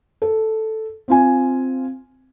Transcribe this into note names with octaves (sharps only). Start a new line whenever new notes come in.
A4
C4 F4 G#5